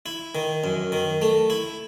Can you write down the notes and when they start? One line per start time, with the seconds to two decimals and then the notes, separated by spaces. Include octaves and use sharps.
0.06 E4
0.35 D#3
0.64 F#2
0.92 D#3
1.22 A3
1.50 E4